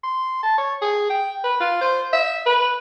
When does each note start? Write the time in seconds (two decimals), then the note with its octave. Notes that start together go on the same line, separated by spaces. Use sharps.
0.03 C6
0.43 A5
0.58 C#5
0.82 G#4
1.10 G5
1.44 B4
1.60 F4
1.81 C5
2.13 E5
2.46 B4